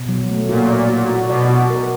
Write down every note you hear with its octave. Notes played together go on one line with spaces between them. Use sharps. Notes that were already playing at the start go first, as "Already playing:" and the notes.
Already playing: B2
F#3
A3
A#2 F#4
D5
F#4
F#4
B2 D5
F#4
A#4